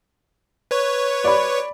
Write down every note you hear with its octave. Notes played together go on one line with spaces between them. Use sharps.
B4 C#5 C#6
D5 B5